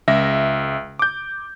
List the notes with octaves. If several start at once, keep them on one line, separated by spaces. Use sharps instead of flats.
C#2 E5 A#6
D6 G6